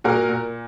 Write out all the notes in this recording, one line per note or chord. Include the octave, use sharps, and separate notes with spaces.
A#2 F#4 A#4
A#2